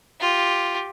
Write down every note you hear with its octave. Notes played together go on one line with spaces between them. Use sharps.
F4 G4